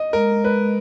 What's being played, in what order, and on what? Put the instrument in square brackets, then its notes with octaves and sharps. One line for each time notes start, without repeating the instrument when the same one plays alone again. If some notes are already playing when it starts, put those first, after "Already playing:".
Already playing: [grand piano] D#5
[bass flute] G#3 [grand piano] A#4
[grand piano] B4